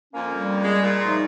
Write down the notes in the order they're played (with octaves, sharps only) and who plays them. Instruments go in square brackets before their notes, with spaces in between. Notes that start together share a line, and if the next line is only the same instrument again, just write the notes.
[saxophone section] F2 [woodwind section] A#3 C#4
[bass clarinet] G3
[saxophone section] G#3
A#2
[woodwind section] C#3 F3 A3 [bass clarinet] D#4